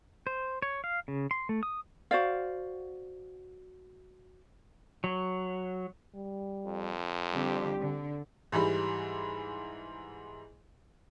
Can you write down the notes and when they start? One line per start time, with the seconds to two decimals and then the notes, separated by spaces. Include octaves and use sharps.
0.27 C5
0.62 C#5
0.84 F5
1.08 C#3
1.31 C6
1.49 A3
1.63 D#6
2.11 F#4 C5 D5 F5
5.04 F#3
6.15 G3
6.66 F2
7.32 D3 G3 C4 G4
7.80 D3
8.52 G#2 E3 G3 B5